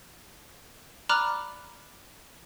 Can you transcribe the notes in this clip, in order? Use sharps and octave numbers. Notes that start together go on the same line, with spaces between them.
D5 A#5 B5 D6 F6 F#6